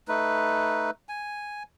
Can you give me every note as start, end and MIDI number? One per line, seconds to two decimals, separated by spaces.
0.08 0.91 57
0.08 0.91 63
0.08 0.91 71
1.09 1.63 80